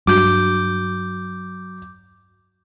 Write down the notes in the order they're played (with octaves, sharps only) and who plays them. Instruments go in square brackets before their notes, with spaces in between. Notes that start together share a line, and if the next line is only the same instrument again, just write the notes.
[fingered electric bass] G2 [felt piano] F#3 [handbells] D6 G6